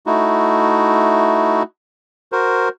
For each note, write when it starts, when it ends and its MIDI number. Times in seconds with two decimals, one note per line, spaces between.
0.07 1.63 57
0.07 1.63 63
0.07 1.63 64
0.07 1.63 66
2.32 2.69 66
2.32 2.69 70
2.32 2.69 72